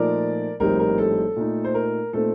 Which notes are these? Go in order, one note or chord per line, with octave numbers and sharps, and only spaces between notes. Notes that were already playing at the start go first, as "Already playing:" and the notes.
Already playing: A#2 F3 A3 D#4 A#4 D5
A#1 A2 G3 C4 D#4 A#4
A#4
A4
A#2 A3 D#4
C5
A#4
A#2 A3 C4 D#4 A4